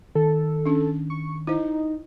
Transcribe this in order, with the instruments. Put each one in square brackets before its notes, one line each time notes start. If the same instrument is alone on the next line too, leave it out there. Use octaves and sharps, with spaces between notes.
[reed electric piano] D#3 [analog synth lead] A4
[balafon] C#4 D4
[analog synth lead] C#6
[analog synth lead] D#4 [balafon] E4 C5